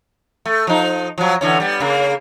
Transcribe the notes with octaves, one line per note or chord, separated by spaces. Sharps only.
A3
F3 D#4
F3 F#3
D3 E3 C#4
G3 B3
C#3 A#3